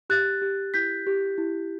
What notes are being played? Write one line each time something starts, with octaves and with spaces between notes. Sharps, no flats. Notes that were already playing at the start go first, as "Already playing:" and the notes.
G4 F#6 A6
G4
E4 G6 B6
G4
E4